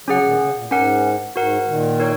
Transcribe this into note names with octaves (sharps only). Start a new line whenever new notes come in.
C#3 F#3 C#4 G#4 F#5
A#2 D#3
C#3
A#2
G#2 C#4 A#4 F#5
G#2 F#4 A#4 F#5
A#2 D#3
D#4 A#4 C#5